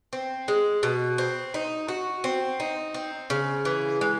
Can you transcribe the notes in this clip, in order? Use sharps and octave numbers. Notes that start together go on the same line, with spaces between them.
C4
G#3
B2
C4
D#4
F#4
C4
D#4
C4
C#3
E3
G#3